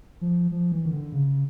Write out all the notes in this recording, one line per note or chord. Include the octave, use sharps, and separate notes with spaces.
F3
F3
E3
D#3
D3
C#3